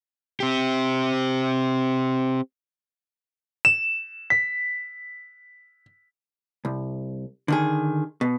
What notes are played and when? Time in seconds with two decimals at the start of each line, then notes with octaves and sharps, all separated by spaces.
0.40 C4 G4
3.65 E7
4.30 B6
6.65 C2
7.48 D3 D#3 G#4
8.21 B2